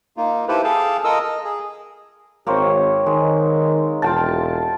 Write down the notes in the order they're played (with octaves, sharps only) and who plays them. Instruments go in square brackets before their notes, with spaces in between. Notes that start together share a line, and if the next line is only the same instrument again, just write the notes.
[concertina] A#3 D#4 F4
E4 F4 G4 A4 B4 C5
G#4 A4 F5 G5 A5
F4 A4 A#4 D#5 D#6 E6
D#5
G#4
[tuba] G#1 [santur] A#3 C4 C#5
[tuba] D#3 [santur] G#3
[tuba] E1 [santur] F4 G5 A5